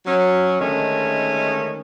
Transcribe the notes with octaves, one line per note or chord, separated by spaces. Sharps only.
F#3 C#4
D3 D#3 G#3 A3 C#4